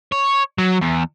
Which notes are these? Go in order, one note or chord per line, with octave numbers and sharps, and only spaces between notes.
C#5
F#3
E2